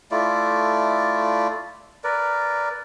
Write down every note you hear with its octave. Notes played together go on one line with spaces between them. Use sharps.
A3 E4 F4 D5
A#4 B4 D5